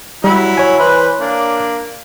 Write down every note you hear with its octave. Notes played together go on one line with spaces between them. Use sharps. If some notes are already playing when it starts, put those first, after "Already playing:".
F#3 G3 E4 B5
C#5 G#5
E3 B4 C5
A#3 D4